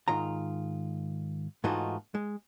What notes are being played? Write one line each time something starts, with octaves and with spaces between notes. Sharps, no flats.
G#2 D#3 F4 A#5
G#2 E3 A3 D#4 F4 F#4
G#3